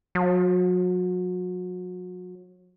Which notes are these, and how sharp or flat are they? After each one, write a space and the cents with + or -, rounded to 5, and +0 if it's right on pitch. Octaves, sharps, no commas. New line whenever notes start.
F#3 -35